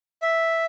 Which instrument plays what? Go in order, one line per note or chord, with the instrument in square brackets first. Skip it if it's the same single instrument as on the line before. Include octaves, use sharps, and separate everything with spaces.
[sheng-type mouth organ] E5